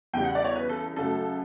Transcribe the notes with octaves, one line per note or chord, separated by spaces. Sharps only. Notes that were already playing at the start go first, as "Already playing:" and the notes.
E2 C#3 G3 G5
F#5
D5
C#5
B4
A4
F#2 C#3 F#3 A3 A4